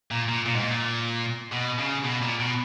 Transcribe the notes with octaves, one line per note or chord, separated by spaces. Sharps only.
A#2
A#2
A#2
G#2
A#2
B2
C#3
B2
A#2
B2